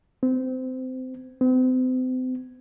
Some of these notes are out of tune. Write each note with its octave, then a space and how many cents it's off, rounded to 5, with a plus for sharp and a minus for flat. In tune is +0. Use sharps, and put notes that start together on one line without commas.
C4 -25
C4 -40